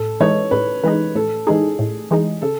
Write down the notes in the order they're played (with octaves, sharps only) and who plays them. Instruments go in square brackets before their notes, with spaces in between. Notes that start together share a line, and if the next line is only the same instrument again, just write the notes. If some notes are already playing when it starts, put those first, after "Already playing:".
Already playing: [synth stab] A2 [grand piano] A4
[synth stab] E3 G#3 D#4 [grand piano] C#5
[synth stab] A2 [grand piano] B4
[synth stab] E3 G#3 D#4 [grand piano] B4
[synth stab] A2 [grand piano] A4
[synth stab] E3 G#3 D#4 [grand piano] G#4
[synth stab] A2
E3 G#3 D#4
[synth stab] C#3 [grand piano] A4